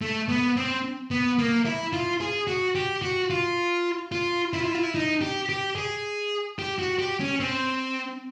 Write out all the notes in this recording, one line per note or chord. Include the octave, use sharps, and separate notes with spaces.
A3
B3
C4
B3
A#3
E4
F4
G#4
F#4
G4
F#4
F4
F4
E4
F4
E4
F4
E4
D#4
G4
G4
G#4
G4
F#4
G4
C#4
C4